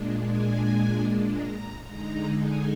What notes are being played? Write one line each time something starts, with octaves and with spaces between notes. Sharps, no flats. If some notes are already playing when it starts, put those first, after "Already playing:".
Already playing: A#2 G#3 D4
G#5
A#5
D3 G#3 D#4 A#5
G#5